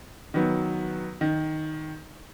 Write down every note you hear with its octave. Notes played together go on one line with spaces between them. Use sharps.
D#3 F#3 B3
D#3